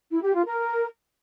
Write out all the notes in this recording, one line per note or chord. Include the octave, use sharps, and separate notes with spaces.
E4
G4
F4
A#4